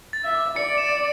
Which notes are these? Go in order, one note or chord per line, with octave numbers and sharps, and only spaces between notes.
A6
E5
D6
D5 C#7
E7